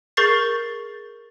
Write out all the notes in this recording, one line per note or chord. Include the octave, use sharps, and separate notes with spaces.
G#4 A#4 C#6 G6 A6 C7